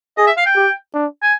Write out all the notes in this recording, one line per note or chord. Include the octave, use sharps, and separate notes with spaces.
G#4 D#5
E5
F5
G5
G4
D4
G#5